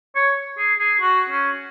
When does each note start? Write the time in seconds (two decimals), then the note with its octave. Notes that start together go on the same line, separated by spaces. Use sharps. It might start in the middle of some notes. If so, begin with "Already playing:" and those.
0.16 C#5
0.58 G#4
0.79 G#4
1.01 F#4
1.30 C#4